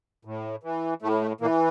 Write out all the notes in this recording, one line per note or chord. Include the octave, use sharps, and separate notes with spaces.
A2
E3
A2 A3
A3
A#2 E3 A#3